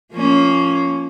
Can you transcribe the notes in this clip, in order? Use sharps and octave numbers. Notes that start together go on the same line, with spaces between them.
F3 A#3 C#4